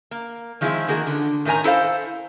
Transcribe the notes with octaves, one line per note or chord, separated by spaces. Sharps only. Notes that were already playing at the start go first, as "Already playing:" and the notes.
A#3
D#3 F3 G#3 C4 E4 G#4
D#3 A#3 F#4 G#4
D3
A2 D#3 A#4 G#5 A#5
E4 A4 C5 F5